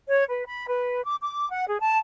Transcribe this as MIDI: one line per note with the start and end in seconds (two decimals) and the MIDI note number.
0.09 0.24 73
0.28 0.43 71
0.45 0.66 83
0.67 1.03 71
1.05 1.15 86
1.21 1.48 86
1.50 1.66 78
1.67 1.78 68
1.79 1.97 81